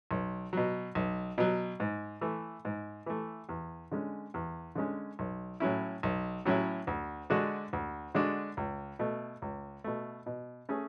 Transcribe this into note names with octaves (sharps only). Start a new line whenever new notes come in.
B1
B2 F#3
B1
B2 F#3
G#2
E3 A3
G#2
E3 A3
E2
D3 G#3 C#4
E2
D3 G#3 C#4
B1
A2 F#3 C#4 E4
B1
A2 F#3 C#4 E4
D2
D3 G#3 D4 F#4
D2
D3 G#3 D4 F#4
C#2
B2 A3
C#2
B2 A3
B2
A3 C#4 G#4